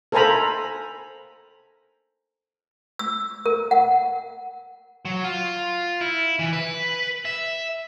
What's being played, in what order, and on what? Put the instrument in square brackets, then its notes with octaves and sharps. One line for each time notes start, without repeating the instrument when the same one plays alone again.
[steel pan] A4 A#4 C5 G#5 A#5 B5
[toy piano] E6
A#4
F#5
[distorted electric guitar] F#3
F4
E4
E3
B4
E5